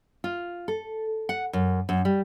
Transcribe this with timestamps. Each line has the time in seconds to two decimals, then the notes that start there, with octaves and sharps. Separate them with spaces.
0.24 F4
0.68 A4
1.29 F#5
1.53 F#2
1.89 F#2
2.05 G3